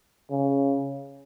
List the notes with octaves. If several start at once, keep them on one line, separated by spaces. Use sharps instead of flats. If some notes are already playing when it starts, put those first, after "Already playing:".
C#3